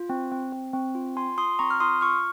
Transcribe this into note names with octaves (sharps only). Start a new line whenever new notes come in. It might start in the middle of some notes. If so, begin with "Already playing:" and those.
Already playing: F4
C4
C4
C4
C4
F4
F4 G#5 C6
F4 C6 D#6
C4 A#5 C#6
F6
F4 C6 D#6
F4 C#6 F6